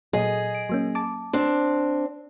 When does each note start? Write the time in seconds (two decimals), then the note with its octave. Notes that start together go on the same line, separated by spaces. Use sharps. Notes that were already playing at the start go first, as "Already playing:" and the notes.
0.13 A#2 F#3 G#4 D#5
0.55 D7
0.69 F#3 A#3 C#4
0.95 A5 D6
1.33 C4 D4